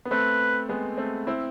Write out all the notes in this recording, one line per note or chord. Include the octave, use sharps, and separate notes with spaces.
B3
A3 C4 B4
G#3 B3
A3 C4
C4 E4